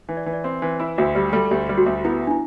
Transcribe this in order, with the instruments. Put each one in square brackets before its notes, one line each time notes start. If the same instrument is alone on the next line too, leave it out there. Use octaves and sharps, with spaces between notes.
[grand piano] E3
[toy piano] D5
[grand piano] E3
[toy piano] D5
[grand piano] C4 [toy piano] E5
[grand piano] E3 [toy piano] C5
[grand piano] E4 [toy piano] B4
[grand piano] D2 [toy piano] F#4
[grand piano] G3 [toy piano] G4
[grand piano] G3 [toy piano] A4
[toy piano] A4
[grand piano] D2 [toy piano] G4
[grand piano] G3
[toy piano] F#4
[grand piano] D2
[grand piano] B3 [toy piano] E4
[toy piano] D4
E4